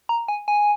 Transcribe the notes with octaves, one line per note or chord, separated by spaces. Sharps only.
A#5
G#5
G#5